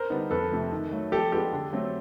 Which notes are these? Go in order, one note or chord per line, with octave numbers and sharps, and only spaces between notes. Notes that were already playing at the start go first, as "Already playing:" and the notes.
Already playing: A#4 C5
D3 G3 B3 D#4
F2 A4 B4
C3 F3 A3
D#3
F#3 A3
F3 G4 A4
G#3 B3 D4 F4 G4 A4
D3
F#3 A3 C4